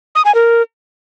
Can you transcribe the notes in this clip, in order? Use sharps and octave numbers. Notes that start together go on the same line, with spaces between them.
D#6
G#5
A#4